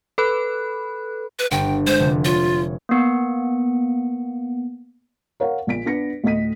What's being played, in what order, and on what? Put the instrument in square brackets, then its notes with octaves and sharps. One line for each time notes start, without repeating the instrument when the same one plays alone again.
[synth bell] A4 B4 B5 F#6
[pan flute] B4
[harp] G1 [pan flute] G5
[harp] G#3 [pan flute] C5
[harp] F1 D3
[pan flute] F4 [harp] C#5
[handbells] A#3 B3 C#7
[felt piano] A#4 C#5 F5 F#5
A#1 A#2 B6 D7
B3 D4 B4 A#6 C#7
D2 A2 D#5 B6 D#7